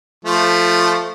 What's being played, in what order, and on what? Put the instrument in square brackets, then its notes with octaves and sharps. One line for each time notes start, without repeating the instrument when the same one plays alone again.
[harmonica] F3 A3